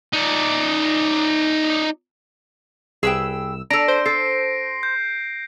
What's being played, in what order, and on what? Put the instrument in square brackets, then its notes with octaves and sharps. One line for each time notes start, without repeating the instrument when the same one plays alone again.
[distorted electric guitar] D#4 D5
[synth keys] C2 E6 [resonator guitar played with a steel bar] G#4 B4 G5
[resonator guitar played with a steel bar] D4 A4 [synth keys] A#5 [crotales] A#6 D7
[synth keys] C5
[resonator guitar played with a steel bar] A4 [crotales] C7
[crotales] G6